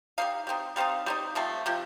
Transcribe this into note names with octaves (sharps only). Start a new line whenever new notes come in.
G3 C4 D#4 F5
G3 C4 D#4
G3 C4 D#4 F5
G3 C4 D#4
C3 F3 A3
C3 F3